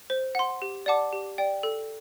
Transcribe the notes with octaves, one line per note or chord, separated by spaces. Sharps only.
C5
F#5 C6
G4
D5 F#5 A5 D6
G4
D5 G5
A4